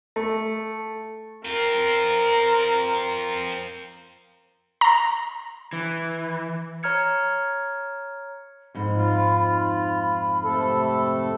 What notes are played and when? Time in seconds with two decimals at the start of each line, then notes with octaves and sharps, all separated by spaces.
0.16 A3
1.45 C4 F4 A#4
4.81 A#5
5.73 E3
6.83 C#5 A#5 F6 G#6 C#7
8.74 F2 G#2 D#4 B5
8.96 F4
10.44 C3 A3 A4